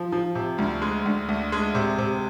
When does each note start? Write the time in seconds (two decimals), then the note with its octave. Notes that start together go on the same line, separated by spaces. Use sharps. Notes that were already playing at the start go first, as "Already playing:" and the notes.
Already playing: F3
0.12 F3
0.35 C3
0.58 D2
0.82 G#3
1.05 D2
1.29 D2
1.52 G#3
1.75 C3
1.98 C3